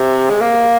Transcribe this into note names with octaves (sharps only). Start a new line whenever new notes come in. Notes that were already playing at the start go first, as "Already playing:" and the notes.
Already playing: C3
G#3
A#3